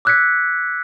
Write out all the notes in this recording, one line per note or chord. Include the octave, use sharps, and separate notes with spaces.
D6 E6 F#6 G#6 B6 C#7